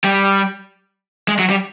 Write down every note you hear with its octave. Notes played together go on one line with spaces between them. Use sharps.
G3
G#3
F#3
G3